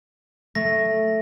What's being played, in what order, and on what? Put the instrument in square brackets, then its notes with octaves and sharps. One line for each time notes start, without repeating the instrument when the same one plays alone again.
[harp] A3 [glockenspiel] A#6